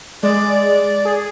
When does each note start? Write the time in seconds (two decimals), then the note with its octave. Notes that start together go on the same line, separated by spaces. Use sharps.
0.23 G#3 D5
1.05 G#4